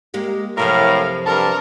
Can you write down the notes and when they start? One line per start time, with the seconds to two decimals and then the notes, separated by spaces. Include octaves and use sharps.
0.14 G#3 A#3 G4
0.57 F#2 A2 C3 F3 A#4 F5
1.26 G2 A4 A#4